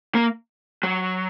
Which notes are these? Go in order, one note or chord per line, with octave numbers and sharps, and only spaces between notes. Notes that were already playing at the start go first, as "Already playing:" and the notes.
A#3
F#3